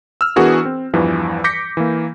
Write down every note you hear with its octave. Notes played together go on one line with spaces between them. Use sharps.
E6 F6
E3 B3 D4 F#4 G#4 A#4
C4
E2 G2 E3 F3
D6 G6 A#6 B6 C#7
E3 A#3